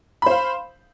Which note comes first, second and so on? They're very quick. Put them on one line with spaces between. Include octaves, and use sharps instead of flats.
B5 C5 F5